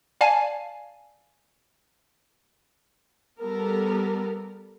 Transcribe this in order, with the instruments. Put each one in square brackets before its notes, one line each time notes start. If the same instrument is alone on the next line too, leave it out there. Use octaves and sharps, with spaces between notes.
[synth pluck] D5 F5 G#5 A5
[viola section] G3 B3 A4 A#4